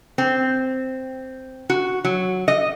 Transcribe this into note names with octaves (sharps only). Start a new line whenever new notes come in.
C4
F#4
F#3
D#5